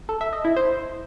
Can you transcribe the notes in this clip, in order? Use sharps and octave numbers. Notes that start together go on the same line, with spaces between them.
A4
E5
D#5
E4
C5